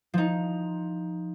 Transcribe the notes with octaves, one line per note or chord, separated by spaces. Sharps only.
F3 D#4